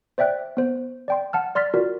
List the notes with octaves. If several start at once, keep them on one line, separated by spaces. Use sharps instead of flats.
C5 D5 E5 G5 F#6
B3 C5
D5 G5 C6
F#5 A5 F6
D5 C6 F6 A6 B6
F4 F#4 A#4 D5